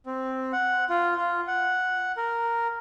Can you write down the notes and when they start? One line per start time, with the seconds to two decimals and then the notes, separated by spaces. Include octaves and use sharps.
0.06 C4
0.52 F#5
0.89 F4
1.17 F4
1.47 F#5
2.17 A#4